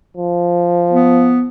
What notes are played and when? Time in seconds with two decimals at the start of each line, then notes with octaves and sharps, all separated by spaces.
0.17 F3
0.91 B3